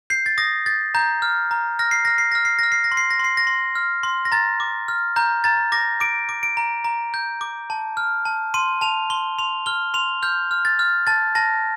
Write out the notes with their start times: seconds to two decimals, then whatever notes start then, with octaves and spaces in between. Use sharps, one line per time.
0.10 G6 C7
0.26 A6
0.38 D#6 A#6
0.66 G6 A6
0.95 A#5 G6
1.22 F6
1.51 A#5
1.79 F6 A#6
1.91 C7
2.05 F6 A#6
2.18 C7
2.32 F6 A#6
2.45 C7
2.59 F6 A#6
2.72 C7
2.84 A#6
2.92 C6
2.97 C7
3.10 A#6
3.19 C6 C7
3.37 A#6
3.47 C6
3.75 F6
4.03 C6
4.25 A#6
4.32 A#5 A6
4.60 D6
4.88 F6
5.16 A#5 G6
5.44 A#5 A6
5.72 D6 A#6
6.00 D6 D7
6.29 D6
6.43 D7
6.57 A#5
6.85 A#5
7.14 G6
7.41 D6
7.70 A5
7.97 F6
8.25 A5
8.54 C6 D#7
8.81 A5 F7
9.10 C6 G7
9.38 C6 F7
9.66 F6 G7
9.94 C6 F7
10.23 F6 G6
10.51 F6
10.65 A6
10.79 F6
11.07 A5 A6
11.35 A5 A#6